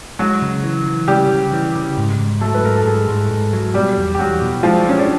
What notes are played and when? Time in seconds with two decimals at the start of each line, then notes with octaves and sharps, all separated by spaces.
0.19 F#3 G#3 F#4
0.42 C#3
0.64 E3
0.87 E3
1.08 C#3 G3 G4
1.30 C#3
1.52 E3
1.75 C#3
1.97 G#2
2.19 G#2
2.41 F#3 A3 A4
2.54 B4
2.64 G#2 A#4
2.76 A4
2.86 G#2 G#3 G#4
3.08 G#2
3.31 G#2
3.53 F#3
3.74 B2 G3 G4
3.97 E2
4.14 G4
4.19 E2 F#3 F#4
4.42 B2
4.63 F3 G#3 F4
4.86 G#3 C#4
4.98 D4